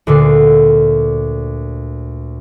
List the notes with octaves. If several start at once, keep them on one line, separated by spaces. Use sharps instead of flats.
D2 A#2 D3 D6 C7